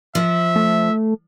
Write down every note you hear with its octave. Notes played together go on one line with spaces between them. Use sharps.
F3 E5
A3